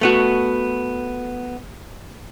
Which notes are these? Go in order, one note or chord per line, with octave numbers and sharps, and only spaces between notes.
A3 B3 F#4